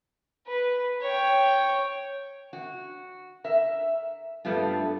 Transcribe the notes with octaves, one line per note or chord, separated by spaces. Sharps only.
B4
C#5 G5
F#4
A#4 E5
G2 G3 A3 B3 F4